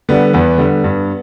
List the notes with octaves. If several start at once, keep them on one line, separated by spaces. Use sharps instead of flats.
D3 G3 B3
E2 B3
D3 G3
G2